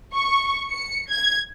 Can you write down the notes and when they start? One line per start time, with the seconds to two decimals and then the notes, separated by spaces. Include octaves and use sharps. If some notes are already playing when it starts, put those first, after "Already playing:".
0.15 C#6
0.71 C#7
1.10 G#6